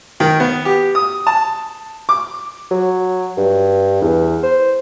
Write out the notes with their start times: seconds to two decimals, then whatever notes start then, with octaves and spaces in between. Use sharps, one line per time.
0.20 D#3
0.40 B3
0.65 G4
0.95 D#6
1.27 A5
2.09 D6
2.71 F#3
3.37 G2
4.02 E2
4.43 C5